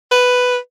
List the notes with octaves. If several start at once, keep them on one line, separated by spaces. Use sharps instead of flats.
B4